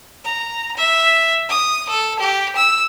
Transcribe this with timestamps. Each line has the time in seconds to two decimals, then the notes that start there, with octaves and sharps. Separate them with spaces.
0.24 A#5
0.77 E5
1.49 D#6
1.89 A4
2.19 G4
2.56 E6